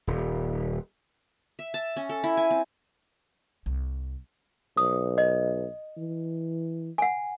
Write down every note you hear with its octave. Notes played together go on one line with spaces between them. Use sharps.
D#1
E5
A5
C#4
A4
E4
G#5
C4
C2
B1 D#6
D#5
E3
F#5 G#5